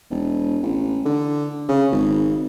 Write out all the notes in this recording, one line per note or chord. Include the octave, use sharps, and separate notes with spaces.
E1
A1
D3
C#3
G#1